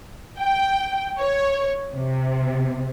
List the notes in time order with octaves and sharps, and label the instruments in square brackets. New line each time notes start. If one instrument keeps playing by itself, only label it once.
[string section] G5
C#5
C3